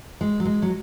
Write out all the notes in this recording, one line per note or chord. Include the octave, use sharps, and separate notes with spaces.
G#3
F#3
G#3
F#3